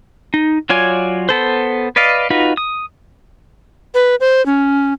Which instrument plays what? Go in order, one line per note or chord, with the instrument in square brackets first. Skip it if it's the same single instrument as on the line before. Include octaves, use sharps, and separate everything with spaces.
[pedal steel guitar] D#4
F#3 F4 C#5 D5 G#5
B3 A4 C5
B4 D5 D#5 F5
D#4 F4 F#4 B4
D#6
[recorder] B4
C5
C#4